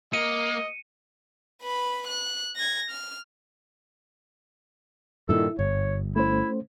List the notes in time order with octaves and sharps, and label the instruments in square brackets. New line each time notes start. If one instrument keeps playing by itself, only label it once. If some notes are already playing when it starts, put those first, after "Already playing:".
[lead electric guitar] A#3 [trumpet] D#5 [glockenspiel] C#7 D#7
[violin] B4 B5
F#6
G#6 A#6
F6
[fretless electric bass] G2 A#2 D#3 [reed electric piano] E4 [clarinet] A4
[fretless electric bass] G1 [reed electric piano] G2 [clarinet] C#5
[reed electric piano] A3 C#4 C5 [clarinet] E4